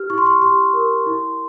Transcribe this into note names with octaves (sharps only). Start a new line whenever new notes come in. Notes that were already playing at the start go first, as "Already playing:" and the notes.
Already playing: G4 F6
E4 C#6
C6
C#6
G4 C6
A#4
E4